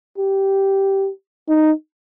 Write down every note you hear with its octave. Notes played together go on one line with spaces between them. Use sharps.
G4
D#4